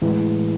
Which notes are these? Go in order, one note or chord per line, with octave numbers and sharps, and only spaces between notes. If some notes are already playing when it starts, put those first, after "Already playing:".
A2 E3 G#3